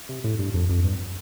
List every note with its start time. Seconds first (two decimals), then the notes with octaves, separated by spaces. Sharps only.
0.09 C3
0.24 A2
0.39 G2
0.54 F2
0.69 F2
0.84 G2